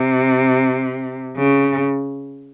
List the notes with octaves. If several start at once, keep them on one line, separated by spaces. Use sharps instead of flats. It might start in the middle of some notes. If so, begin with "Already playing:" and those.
Already playing: C3
C#3